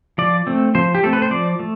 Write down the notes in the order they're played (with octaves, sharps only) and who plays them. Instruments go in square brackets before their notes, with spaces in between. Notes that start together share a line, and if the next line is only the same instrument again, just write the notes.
[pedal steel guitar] F3 D5
A3 C4
F3 C5
G4
A3 C4 A4
B4
C5
F3 D5
A3